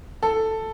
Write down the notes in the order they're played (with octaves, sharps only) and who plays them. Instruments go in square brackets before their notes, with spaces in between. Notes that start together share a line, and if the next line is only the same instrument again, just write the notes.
[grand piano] A4